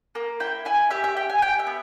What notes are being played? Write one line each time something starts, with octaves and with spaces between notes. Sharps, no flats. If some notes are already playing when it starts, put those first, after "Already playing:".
A#3
E4 G5
E4 G#5
G4 E5
E5
G4 G5
G#5
G4 G5
E5
B3